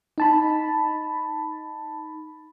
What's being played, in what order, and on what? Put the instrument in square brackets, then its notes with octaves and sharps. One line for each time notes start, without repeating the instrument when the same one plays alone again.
[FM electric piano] D#4 A5 B5